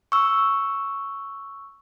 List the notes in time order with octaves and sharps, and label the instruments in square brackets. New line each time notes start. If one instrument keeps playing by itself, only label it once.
[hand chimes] C#6 E6